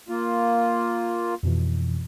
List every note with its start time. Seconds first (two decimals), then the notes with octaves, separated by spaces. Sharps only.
0.09 A#3 F4
1.43 F2 B2 E3